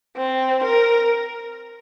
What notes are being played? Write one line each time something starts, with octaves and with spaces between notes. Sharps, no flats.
C4
A#4